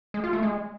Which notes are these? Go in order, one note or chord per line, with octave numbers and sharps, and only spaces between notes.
G#3
F4
A3
G#3